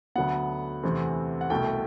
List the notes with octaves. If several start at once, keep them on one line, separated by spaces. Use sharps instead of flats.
D2 D3 F#3 B3 F#5
E2 C3 E3 A3 C4
F#5
C2 B2 A3 G5